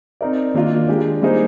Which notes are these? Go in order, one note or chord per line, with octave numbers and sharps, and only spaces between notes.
C4 D#4 A#4 D5
D#3 A#3 D4 F4
G#3 D4 G4 D5
G3 A#3 D#4 G#4 C5